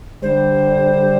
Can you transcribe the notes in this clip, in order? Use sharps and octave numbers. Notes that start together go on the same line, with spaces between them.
D3 G3 C5